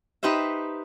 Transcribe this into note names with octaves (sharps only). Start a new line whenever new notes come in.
D#4 G4 B4 C5 E5